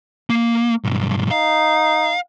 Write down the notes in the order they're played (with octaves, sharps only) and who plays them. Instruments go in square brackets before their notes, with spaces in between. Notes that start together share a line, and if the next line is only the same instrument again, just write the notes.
[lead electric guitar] A#3
B1 G2
[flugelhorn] D#4 [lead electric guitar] F5